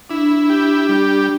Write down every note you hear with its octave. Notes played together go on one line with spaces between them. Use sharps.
D4 E4
G4
G3